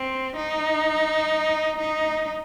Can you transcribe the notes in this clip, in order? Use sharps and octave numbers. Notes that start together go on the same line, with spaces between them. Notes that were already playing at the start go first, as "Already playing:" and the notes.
Already playing: C4
D#4
D#4